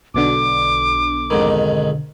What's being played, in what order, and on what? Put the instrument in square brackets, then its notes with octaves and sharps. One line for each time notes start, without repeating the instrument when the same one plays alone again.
[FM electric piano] B1 B2 D3 [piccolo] D6
[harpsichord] F2 G#2 D#3